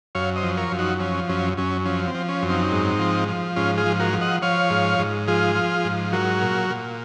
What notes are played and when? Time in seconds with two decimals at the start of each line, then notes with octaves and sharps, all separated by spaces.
0.15 F#2 C#5 F5
0.36 C5 D#5
0.43 F3
0.57 A#4 C#5
0.72 F#2
0.79 D#4 F#4
1.00 F3 C#4
1.29 F#2 C#4
1.57 F#2 C#4
1.85 F3 C#4
2.08 C4
2.14 F3
2.29 C#4
2.42 F#2
2.49 C4 D#4
2.71 G#2
2.99 F3
3.28 F3
3.56 G#2 C#4 F4
3.78 F4 G#4
3.86 F3
4.00 F#4 A#4
4.13 F3
4.21 D#5 F#5
4.42 F3 C#5 F5
4.70 G#2
4.99 G#2
5.27 F3 F4 G#4
5.55 F3
5.85 G#2
6.12 F#3 F#4 A#4
6.41 A#2
6.70 A#2